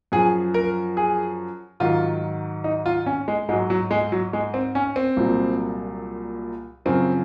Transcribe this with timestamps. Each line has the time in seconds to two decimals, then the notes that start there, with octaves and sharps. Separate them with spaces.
0.12 F#2 F3 G#4
0.54 A#4
0.97 G#4
1.80 G#2 D#3 F#3 F4
2.64 D#4
2.86 F4
3.06 C#4
3.28 G#3
3.49 G#2 G#3
3.52 F#3
3.70 F#3
3.91 G#3
4.12 F#3
4.33 G#3
4.54 C4
4.75 C#4
4.96 C4
5.17 C2 A#2 F#3
6.85 F#2 C#3 F3 C4